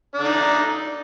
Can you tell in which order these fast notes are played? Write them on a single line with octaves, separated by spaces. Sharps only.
D4 D3 D#4